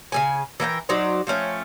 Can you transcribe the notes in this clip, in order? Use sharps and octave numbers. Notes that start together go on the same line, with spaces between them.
C#3 G3 G#5
E3 A#4 E5 G5
F#3 D#4 C5 D5
F3 A3 C#4 G5